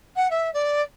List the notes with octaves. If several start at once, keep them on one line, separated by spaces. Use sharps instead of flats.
F#5
E5
D5